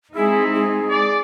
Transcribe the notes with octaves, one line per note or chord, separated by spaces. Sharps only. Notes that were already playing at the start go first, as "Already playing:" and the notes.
G#3 C4 D#4 E4 G#4
G#4
D5